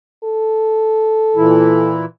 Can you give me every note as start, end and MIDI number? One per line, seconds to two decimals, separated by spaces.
0.24 1.91 69
1.36 2.05 46
1.36 2.05 52
1.36 2.05 64